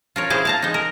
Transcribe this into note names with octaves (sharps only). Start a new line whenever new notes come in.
F4 A#4 C#5
E4 G#4 C5 F5
F5 A5 A#5
G#3 D#4
A#4